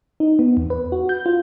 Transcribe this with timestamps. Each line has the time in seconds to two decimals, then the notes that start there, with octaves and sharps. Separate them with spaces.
0.20 D#4
0.39 B3
0.57 E2
0.70 B4
0.92 F#4
1.09 G6
1.26 F4